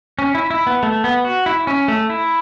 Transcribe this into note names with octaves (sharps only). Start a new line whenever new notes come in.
C#4
E4
E4
B3
A3
B3
F#4
E4
C#4
A3
E4